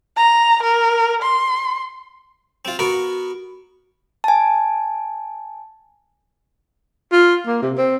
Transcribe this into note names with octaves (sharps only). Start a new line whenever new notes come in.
A#5
A#4
C6
C4 F4
B3 F#4 A#4
G#5 A5
F4
A#3
C3
C4